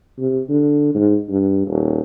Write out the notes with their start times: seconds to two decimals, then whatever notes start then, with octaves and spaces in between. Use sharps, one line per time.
0.19 C3
0.50 D3
0.95 G#2
1.30 G2
1.67 D#1